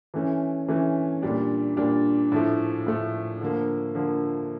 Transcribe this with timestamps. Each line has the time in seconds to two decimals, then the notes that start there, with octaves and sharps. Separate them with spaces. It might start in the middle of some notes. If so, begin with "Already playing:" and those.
0.14 E3 A3 C#4
0.68 E3 A3 C#4
1.22 A#2 G3 D4
1.77 A#2 G3 D4
2.32 A2 F3 A3
2.86 A2 F3 A3
3.41 D3 F3 A#3
3.95 D3 F3 A#3